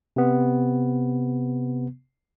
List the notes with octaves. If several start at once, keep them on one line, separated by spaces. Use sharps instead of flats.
C3 B3